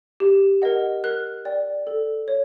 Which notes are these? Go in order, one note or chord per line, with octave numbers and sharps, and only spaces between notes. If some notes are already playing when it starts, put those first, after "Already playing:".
G4
A#4 D#5 F#5
A#4 F#6
D5 G5
A4
C#5